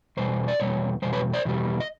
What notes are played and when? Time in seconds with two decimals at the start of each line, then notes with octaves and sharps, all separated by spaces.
0.17 E2 B2 G3 C5
0.48 D5
0.60 E2 B2 G3 C#5
1.02 E2 B2 G3 C5
1.13 B4 C#5
1.34 C5 D5
1.45 E2 B2 G3
1.80 D#5